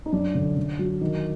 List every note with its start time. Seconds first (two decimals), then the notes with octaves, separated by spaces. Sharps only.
0.06 D#4
0.13 F#2 D4
0.35 D3
0.57 D3
0.79 F#3
1.01 D#3